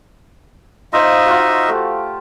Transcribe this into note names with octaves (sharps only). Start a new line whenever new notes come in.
D#4 F4 C5 D#5 E5
F4 F#4
A3 G4